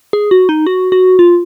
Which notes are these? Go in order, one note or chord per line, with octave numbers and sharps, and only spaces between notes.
G#4
F#4
D#4
F#4
F#4
F4